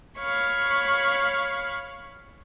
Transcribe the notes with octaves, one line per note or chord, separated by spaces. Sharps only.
C#5 F5 B5 C#6